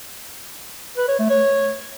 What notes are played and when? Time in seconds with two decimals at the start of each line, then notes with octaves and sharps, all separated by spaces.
0.97 B4
1.08 C#5
1.19 A3
1.30 C#5